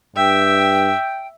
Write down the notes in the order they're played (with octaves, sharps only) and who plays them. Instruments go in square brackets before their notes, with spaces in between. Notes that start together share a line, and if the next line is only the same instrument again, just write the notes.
[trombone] G2 [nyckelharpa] E5 [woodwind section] G5